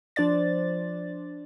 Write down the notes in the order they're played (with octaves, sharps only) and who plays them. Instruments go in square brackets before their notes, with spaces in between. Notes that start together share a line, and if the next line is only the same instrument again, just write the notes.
[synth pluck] F3 D4 C5 D5 A6